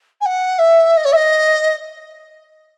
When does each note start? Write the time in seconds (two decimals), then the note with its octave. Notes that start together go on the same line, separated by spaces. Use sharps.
0.21 G#5
0.26 F#5
0.59 E5
0.97 D#5
1.05 C#5
1.13 E5
1.16 D#5